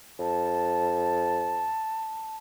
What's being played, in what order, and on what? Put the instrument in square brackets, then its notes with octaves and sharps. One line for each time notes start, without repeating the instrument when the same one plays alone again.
[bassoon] F2 [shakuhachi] A5